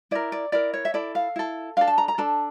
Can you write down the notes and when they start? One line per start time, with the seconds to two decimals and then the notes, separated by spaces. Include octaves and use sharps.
0.11 E4 A#4 D5
0.32 D5
0.52 E4 A#4 D5
0.74 C#5
0.85 E5
0.94 E4 A4 D5
1.15 F5
1.36 E4 A4
1.77 D4 A4 F5
1.87 A5
1.98 A#5
2.08 A#5
2.18 D4 A4 A5